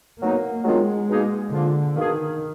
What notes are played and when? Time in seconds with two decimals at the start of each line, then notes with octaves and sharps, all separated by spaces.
0.20 B2 F#3 A#3 B3 D#4
0.64 D#3 F#3 G#3 B3 D4 F4
1.08 B2 A#3 D#4 G#4
1.51 D3 F3 A#3 F4
1.96 B2 D#3 A#3 D4 G#4